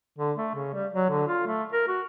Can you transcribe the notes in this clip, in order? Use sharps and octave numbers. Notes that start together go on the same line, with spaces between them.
D3
A3
C#3
G3
F#3
D3
F4
A3
A#4
F#4